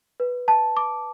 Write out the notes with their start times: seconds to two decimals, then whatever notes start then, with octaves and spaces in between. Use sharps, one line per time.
0.20 B4
0.48 A5
0.77 D6